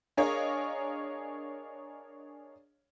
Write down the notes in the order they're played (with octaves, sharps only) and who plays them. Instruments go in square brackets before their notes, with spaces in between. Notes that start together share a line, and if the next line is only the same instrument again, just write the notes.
[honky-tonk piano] D4 G#4 A#4 C#5 D#5 F5